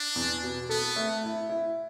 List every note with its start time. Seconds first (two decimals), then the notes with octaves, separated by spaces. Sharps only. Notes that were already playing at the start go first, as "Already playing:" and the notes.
Already playing: D4
0.16 E2
0.43 B2
0.69 B3 A4
0.96 A3
1.24 E4
1.50 E4